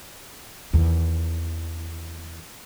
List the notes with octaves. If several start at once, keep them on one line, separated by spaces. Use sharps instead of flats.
E2 D#3